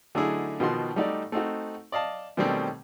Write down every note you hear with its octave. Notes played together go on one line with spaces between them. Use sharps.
D3 F#3 A3 D#4 E4 G#4
B2 D#3 F3 F#4 C6
G3 A3 D#4 F#4 D5
A3 C4 D#4 F#4
D5 D#5 F5 A5
B2 D#3 G3 A3 C4 C#4